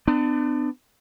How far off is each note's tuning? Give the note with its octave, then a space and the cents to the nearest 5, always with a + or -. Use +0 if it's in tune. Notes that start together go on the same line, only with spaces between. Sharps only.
B3 +45 D4 +35